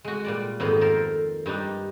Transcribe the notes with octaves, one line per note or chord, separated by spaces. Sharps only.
G#3 F#4
A#2 G3 D5
F2 G#2 D#3 B3
A4 A#4 C5
G2 G3 D4 D#4